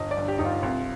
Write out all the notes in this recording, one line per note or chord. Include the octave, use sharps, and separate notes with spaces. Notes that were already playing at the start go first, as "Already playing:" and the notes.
Already playing: G1 D#5
D5
G2
G4
G1 D#4
F4
C2 F4